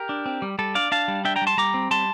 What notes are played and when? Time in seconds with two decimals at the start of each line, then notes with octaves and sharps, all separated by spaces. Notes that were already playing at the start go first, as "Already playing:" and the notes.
Already playing: G4 A#4
0.09 D4
0.26 C4
0.42 G3
0.59 G3 A4
0.75 D4 D5 F5
0.92 D4 F5 A5
1.08 G3
1.25 D4 E5 G5
1.36 G5 A#5
1.42 G3
1.47 A5 C6
1.58 G3 A#5 D6
1.74 C4
1.91 G3 A5 C6